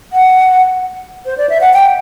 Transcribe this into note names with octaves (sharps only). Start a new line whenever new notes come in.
F#5
C5
D5
E5
F#5
G5